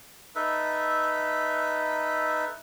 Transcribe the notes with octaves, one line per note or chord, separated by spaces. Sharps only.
D#4 A4 B4 E5